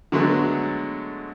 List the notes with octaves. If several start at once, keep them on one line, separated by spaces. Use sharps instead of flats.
D3 F#3 G#3 A3 B3